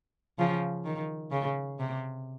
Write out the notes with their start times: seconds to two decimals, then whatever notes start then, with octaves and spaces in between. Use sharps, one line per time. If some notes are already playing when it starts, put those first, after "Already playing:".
0.39 C#3 F3
0.85 D#3
1.32 C#3
1.79 C3